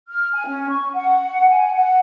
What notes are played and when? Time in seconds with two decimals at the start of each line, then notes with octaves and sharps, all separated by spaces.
0.08 F6
0.34 G#5
0.48 C#4
0.69 C#6
0.93 F#5
1.49 G#5
1.73 F#5